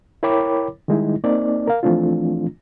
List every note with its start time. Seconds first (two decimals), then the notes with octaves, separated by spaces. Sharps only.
0.23 E4 A#4 C#5 G5 B5 D6
0.88 D#3 G3 G#3 D#4 E4
1.24 A#3 C4 D#4 D5
1.67 A#4 F5
1.83 E3 F3 A3 C4 D4 F4